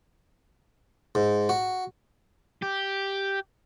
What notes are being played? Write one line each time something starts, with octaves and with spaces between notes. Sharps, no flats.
G#2
F#4
G4